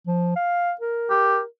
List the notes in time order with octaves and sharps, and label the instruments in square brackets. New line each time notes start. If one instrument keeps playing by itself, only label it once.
[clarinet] F3
F5
A#4
[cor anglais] G4